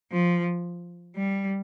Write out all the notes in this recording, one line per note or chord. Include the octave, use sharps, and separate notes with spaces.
F3
G3